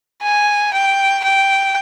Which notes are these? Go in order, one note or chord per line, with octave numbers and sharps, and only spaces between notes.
G#5
G5
G5